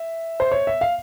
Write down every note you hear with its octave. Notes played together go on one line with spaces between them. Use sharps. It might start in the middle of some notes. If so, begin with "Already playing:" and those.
Already playing: E5
C5
C#5
E5
F5